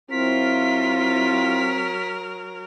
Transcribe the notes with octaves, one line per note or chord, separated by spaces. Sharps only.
F#3 C4 E4 F4 A#4 B6